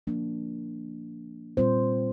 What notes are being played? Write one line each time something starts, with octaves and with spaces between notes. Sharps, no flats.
F3 A#3 D4
A#2 G3 C4 F4 C5